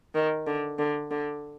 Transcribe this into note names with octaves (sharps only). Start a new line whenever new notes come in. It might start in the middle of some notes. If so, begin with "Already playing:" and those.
D#3
D3
D3
D3